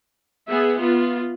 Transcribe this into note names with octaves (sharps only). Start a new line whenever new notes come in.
B3 G#4 E5
B3 F4